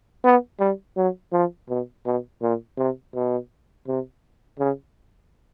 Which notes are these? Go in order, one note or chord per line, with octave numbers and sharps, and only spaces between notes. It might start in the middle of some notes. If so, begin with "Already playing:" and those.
B3
G3
F#3
F3
B2
B2
A#2
C3
B2
C3
C#3